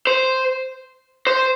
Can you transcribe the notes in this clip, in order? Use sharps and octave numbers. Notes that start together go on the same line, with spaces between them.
C5
C5